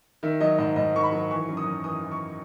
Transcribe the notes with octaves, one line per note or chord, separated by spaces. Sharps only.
D#3 E5
F#3 D#5
G#2 D#5
G#2 D#5
D#3 C#6
B5
F#3
E3 C#6
F#2
D#6
F#2
E3 D#6
E3
C#6